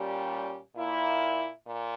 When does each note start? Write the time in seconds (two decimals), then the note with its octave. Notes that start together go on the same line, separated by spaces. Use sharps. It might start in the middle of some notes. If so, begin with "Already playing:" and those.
Already playing: A#2 G3 C#4 G4
0.76 A#2 A#3 E4
1.66 A#2